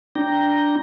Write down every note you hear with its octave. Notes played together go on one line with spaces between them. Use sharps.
D4 G5 A#5